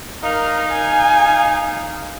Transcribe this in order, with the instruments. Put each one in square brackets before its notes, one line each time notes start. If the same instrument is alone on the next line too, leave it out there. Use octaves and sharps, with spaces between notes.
[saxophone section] D#4 F5 [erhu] A#4
[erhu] G#5